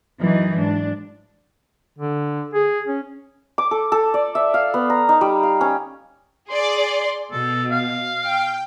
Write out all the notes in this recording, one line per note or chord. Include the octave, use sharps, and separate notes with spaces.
F#2 E3 F#3 D#4
G#2 F#3 D4
D3
G#4
C#4
D6
A4
A4
D5
E5
F5
B3
A#5
D#4
G3
F5
C#4
G#4 D5 C6
B2 A4
F5
G5